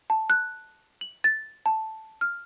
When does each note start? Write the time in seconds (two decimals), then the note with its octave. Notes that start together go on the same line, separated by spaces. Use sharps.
0.10 A5
0.30 F#6
1.01 F#7
1.24 A6
1.66 A5
2.21 F6